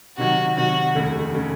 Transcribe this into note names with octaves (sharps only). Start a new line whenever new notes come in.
C3 D#3 F#3 F#4
C3 D#3 F#3 F#4
F1 D#2 C#3 A3
C#3 A3